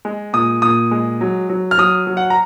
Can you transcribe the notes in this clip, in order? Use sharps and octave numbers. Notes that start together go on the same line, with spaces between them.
G#3
A#2 D#6
A#2 D#6
G#3
F#3
F#3
F6
F#3 D#6
F#3
F#5
A#5